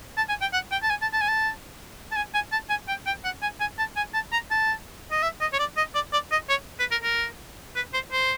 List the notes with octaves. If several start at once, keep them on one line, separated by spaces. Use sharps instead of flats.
A5
G#5
G5
F#5
G5
A5
G#5
A5
A5
G#5
A5
A5
G#5
G#5
A5
G#5
G5
G5
F#5
G#5
G#5
A5
G#5
A5
A#5
A5
D#5
E5
D#5
C#5
D5
D#5
D5
D5
D#5
C#5
B4
A#4
A#4
B4
C5
C5